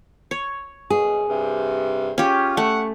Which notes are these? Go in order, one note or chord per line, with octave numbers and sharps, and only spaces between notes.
C#5
F#2 B2 G#4
G2 C3
C#4 F4 G4
A3 F#5